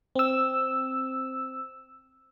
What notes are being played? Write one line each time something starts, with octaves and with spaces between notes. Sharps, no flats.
C4 E6